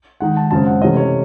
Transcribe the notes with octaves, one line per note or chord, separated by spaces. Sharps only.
D#3 G#3 D#4 F#5
A5
F#2 C#3 G#3 C4 A5
F#5
C3 E3 A3 C#4 D#5
C#5